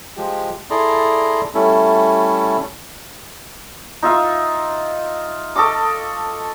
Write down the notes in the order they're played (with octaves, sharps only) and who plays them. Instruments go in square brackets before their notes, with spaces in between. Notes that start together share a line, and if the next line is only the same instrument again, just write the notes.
[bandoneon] F3 G#3 G4
E4 G#4 A4 D5 A#5 C6
G3 A3 C#4 E4 A4
[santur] D#4 F4 E5 F5
A4 D#5 C#6 D6